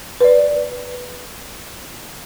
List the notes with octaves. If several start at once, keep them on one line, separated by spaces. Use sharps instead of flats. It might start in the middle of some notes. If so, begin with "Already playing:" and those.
B4 D5